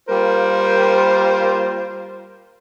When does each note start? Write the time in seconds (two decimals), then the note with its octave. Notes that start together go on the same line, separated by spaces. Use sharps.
0.09 G3 A#3 F4 A#4 C5